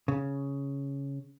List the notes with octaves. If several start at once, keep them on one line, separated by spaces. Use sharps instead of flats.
C#3